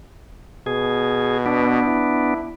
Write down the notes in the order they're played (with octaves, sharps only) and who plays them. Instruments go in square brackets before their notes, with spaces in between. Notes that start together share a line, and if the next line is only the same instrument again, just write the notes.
[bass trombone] B2 [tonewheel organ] G#4
[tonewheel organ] B3 D4
[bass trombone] E4